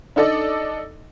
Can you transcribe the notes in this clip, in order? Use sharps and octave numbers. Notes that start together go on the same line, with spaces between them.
D4 D#4 A4 D5 D#5